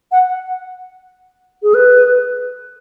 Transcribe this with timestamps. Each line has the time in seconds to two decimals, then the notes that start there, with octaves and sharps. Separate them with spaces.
0.12 F#5
1.63 G#4
1.74 B4